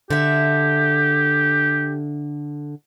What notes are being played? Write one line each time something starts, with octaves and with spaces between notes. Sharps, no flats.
D3 G4 E5